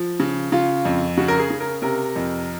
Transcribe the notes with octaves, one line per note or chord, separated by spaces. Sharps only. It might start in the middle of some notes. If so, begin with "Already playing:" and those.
Already playing: F3
C#3
C#3 F4
F2
C#3 F#4
A#4
G#4
C#3
A#4
C3 A#4
F2